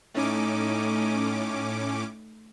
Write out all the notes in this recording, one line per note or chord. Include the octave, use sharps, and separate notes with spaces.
A2 A3 C#4 D#4 D6